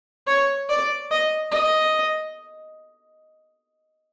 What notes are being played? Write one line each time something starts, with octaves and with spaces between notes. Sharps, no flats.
C#5
D5
D#5
D#5